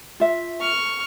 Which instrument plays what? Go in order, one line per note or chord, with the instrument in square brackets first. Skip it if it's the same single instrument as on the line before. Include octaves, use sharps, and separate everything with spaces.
[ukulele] F4 E5
[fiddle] C#6 F6